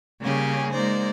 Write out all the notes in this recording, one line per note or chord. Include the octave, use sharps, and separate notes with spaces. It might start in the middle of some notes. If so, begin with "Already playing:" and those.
C#3 G3 A#3 C#4 G4 G#4
G#3 A#3 D#4 C5 D5